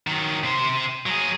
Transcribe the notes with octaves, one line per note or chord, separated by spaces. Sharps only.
D#3 F#3
C3 C5
F#3 G#4